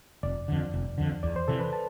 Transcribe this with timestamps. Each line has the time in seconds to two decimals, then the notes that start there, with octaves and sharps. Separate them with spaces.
0.23 F1 D5
0.48 F2 D3
0.74 F1
0.98 F2 D3
1.23 E2 D5
1.36 C5
1.48 C3 E3 A4
1.60 B4
1.73 A5